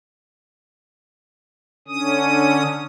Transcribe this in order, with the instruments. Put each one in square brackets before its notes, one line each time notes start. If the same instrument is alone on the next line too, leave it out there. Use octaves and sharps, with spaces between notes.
[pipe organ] D3 C#4 D#6